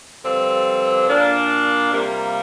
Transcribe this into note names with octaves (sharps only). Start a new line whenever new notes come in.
G2 D3 F3 C4
A#2 A#3 D4
C3 G3 A#3 F4